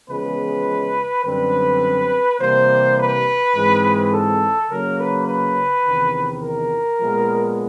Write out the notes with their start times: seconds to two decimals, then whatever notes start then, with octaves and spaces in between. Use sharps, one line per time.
0.09 E2 C#3 F3 G#3 B3 B4
1.24 F#2 D3 G3 C4 B4
2.40 C3 E3 G3 A#3 C5
2.98 B4
3.55 G#2 E3 G#3 C4
4.13 A4
4.70 C#3 F#3 A#3 A#4
4.99 B4
5.28 B4
5.85 E2 C3 D#3
6.42 A#4
7.00 A#2 F3 G#3 B3